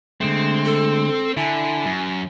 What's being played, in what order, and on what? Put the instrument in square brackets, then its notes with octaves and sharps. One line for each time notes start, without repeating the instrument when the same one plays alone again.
[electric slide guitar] D3 G#3 A3 [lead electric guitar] C4
[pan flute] A4
[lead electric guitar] D3 [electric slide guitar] E4 [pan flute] G#5
[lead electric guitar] F#2